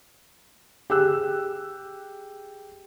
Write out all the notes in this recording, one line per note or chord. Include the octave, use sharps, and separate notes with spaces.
G4 G#4 E6 F#6